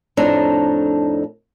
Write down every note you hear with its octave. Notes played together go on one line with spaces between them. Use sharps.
F2 A2 D4 D#4 A4 A#5